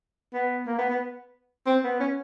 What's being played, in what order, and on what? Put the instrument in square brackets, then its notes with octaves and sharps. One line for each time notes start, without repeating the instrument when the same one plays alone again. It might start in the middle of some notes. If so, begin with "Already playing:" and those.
[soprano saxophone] B3
A#3
B3
B3
C4
B3
C#4